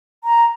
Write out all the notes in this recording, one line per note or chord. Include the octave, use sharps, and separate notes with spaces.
A#5